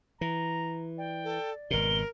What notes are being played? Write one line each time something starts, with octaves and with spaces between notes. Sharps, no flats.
E3 A#5
D5 G5
A4
G#1 B2 A#4 G7